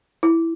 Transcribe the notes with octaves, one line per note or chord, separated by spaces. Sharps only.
E4